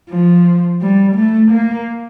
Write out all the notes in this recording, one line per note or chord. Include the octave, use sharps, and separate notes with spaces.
F3
G3
A3
A#3